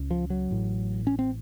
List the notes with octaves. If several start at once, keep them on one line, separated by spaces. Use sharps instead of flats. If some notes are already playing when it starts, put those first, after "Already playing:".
Already playing: C#2 C#3
F3
F#3
A1 A2
C#4
C4